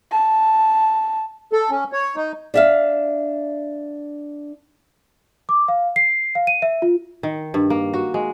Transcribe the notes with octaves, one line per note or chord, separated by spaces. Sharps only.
A5
A4
C#4
C#5
D#4
D4 E5 F5
D6
F5
C7
F5
D#7
E5
F4
D#3
G2
A#3
F#4
G#3